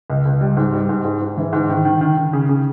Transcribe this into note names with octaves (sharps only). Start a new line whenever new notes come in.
C#2
C#2
G3
G#2
G3
G#2
G#2
G#2
E3
G#2
D#3
D#3
D#3
D#3
C#3
C#3